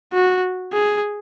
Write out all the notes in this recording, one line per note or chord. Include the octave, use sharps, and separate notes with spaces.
F#4
G#4